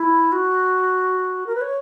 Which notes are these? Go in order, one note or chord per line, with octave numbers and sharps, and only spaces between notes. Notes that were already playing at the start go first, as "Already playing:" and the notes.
Already playing: E4
F#4
A#4
B4
C#5